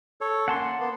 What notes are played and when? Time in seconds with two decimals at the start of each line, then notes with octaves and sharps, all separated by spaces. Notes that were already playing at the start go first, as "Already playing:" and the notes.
0.21 A4 C#5
0.48 A#3 C#4 F#5 A5 C6
0.79 A#3 B3